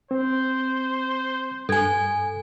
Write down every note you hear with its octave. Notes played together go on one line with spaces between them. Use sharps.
C4 C5
G2 A4 G#5 G#6